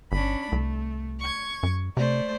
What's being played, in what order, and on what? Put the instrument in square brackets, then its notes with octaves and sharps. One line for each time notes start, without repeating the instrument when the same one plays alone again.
[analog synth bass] G1 [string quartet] C#4 D4 B5
[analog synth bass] C2 [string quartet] A3
[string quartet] C#6 G#6
[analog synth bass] F#2
[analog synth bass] C3 [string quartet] A3 C5 D5